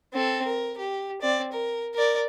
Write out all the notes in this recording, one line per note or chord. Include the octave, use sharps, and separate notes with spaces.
C4 A4
A#4
G4
C4 D5
A#4
A#4 D5